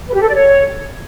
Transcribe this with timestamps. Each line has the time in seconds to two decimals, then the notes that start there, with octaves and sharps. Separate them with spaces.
0.08 B4
0.14 G4
0.21 A4
0.28 D5
0.35 C#5